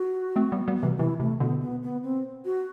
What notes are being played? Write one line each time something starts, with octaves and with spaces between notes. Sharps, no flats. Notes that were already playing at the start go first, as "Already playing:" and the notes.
Already playing: F#4
A3 C4
G3 B3
G3 B3
C3 E3
C3 E3 E4
C3 A3
B2 D3 B3
B3
B3
C4
F#4